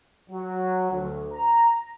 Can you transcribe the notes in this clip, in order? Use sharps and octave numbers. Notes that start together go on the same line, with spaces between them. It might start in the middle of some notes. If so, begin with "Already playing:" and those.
F#3
D2
A#5